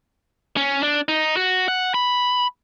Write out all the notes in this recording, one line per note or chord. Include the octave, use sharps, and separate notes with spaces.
C#4
D4
D#4
F#4
F#5
B5